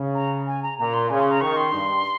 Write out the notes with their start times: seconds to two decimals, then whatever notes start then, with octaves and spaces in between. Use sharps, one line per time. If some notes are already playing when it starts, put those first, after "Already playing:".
Already playing: C#3
0.15 A#5
0.47 G#5
0.63 A#5
0.78 A#2 A#5
0.94 C6
1.10 C#3 G#5
1.20 C6
1.31 A#5
1.41 D#3 C#6
1.57 C6
1.73 G2